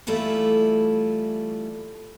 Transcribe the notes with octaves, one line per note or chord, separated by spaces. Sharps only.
E3 G3 A3 E4 F4